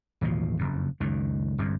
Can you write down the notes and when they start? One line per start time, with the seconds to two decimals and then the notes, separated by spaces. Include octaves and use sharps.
0.21 A1 D#2 B2 F3
0.59 F#1 F2
1.00 C#2 F#2 D#3
1.58 G1 C2 G2